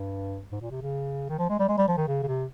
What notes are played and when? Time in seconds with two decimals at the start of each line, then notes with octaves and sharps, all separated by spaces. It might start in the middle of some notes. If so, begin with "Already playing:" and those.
Already playing: G2
0.52 G#2
0.61 A#2
0.71 C3
0.81 C#3
1.29 D#3
1.39 F3
1.49 G#3
1.59 G3
1.68 G#3
1.78 G3
1.88 F3
1.97 D#3
2.08 C#3
2.23 C#3
2.27 C3